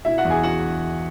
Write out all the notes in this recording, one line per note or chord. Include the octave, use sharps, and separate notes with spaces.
B2 E4 E5
F#4 F#5
E2
G#4 G#5
F#4 F#5